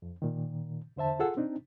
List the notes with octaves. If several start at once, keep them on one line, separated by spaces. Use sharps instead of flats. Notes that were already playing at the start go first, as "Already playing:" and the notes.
F2
A#2 D#3
E2 D3 C5 E5 A5
F4 G#4 A4 F#5 E6
C4 D4 D#4